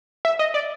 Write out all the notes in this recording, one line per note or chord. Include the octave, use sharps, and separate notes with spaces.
E5
D#5
D5